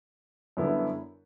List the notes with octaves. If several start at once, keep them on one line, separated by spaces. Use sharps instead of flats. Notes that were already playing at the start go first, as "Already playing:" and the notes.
F#2 D3 G3 B3 E4